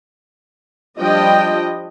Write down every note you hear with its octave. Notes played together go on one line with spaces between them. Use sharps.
F3 G3 D4 D#5 G5